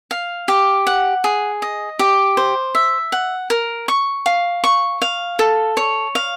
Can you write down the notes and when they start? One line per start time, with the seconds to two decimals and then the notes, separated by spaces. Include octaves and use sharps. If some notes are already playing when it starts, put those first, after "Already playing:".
0.11 F5
0.48 G4
0.87 F#5
1.24 G#4
1.62 D#5
1.99 G4
2.37 C5
2.75 E5
3.12 F#5
3.50 A#4
3.88 C#6
4.26 F5
4.64 C#6
5.02 F5
5.39 A4
5.77 C#5
6.15 F5